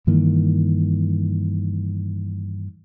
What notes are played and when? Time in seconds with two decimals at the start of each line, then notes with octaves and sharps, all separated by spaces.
0.07 G2 D#3 E3 A#3